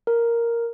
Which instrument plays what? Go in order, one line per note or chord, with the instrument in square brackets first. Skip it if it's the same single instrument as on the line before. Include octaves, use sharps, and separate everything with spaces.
[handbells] A#4